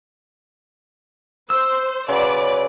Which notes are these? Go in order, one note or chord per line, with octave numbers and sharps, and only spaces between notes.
C5 E6
C#3 F#3 B4 D5 C6